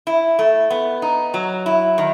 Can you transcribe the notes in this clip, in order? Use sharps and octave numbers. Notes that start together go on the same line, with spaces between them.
E4
A3
B3
D#4
F#3
E4
D#3